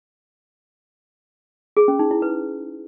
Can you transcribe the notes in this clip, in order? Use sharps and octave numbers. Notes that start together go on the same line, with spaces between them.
G#4
C#4
D#4
E4
B4